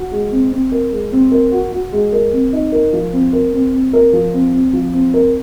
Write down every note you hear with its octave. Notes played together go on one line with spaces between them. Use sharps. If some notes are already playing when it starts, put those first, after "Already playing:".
Already playing: F#4
G#3
C4
C4
A#4
G#3
C4
A#4
F#4
F#4
G#3
A#4
C4
D#4
A#4
F3
C4
A#4
C4
C4
A#4
F3
C4
C4
F3
C4
A#4